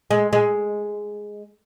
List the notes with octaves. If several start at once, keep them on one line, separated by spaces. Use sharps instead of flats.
G#3
G#3